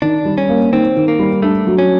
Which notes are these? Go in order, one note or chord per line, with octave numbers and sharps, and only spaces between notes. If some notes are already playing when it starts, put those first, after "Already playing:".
D#3 D4
G3
C#4
A#3
D#3 C4
D#3
A#3
G3
A3 D4
F#3
C#4